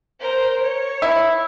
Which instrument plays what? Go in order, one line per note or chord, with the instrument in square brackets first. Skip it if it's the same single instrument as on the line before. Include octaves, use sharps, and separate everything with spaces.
[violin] A#4 C5
C#5
[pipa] E4